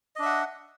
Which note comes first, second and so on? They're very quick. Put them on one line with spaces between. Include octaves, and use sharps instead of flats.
D#5 D4 E5 F#5